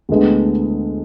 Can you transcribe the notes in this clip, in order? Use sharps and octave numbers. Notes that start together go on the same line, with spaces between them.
D2 D3 G#3 B3